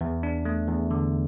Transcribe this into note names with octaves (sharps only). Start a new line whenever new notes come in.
E2
D4
A3
E2
D3